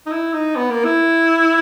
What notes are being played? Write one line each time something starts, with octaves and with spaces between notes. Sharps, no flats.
D#4
E4
D#4
B3
A#3
E4